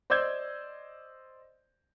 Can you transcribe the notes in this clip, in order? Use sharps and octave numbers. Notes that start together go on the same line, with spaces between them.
C5 D5 D#5 E6 G6 G#6